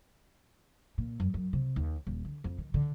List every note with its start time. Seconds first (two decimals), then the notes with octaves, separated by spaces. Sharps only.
0.98 A#2
1.20 F#2
1.34 F#2
1.53 C3
1.76 D#2
2.07 D#1
2.25 D3
2.44 F2
2.58 D#3
2.74 D3